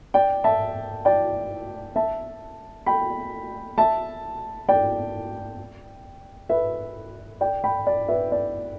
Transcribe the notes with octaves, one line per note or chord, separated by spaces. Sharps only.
D5 G5
E5 A5
D5 G5
E5 A5
G5 B5
E5 A5
D5 G5
B4 E5
D5 G5
G5 B5
D5
B4 E5
D5